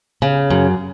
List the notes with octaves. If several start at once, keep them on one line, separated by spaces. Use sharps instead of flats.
C#3
F#2